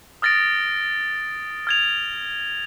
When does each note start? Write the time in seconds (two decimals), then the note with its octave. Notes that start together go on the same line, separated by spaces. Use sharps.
0.22 D#6 F6 A6 A#6 D7
1.67 F6 G#6 F7